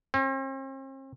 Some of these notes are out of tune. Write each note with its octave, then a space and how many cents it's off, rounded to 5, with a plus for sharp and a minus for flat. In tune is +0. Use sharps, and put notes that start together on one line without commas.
C4 +45